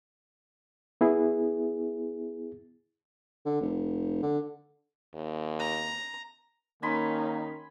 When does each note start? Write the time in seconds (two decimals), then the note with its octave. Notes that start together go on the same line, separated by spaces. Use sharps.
1.01 B3 E4 G#4
3.45 D3
3.61 F1
4.23 D3
5.14 D#2
5.60 A#5
6.83 D#3 A#3 C#4 D#4 G#5 B5 C6